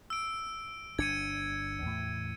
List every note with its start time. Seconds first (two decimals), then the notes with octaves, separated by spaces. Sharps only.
0.10 E6 D7
0.99 G1 D4 G#6 C#7 D#7
1.82 E2 A2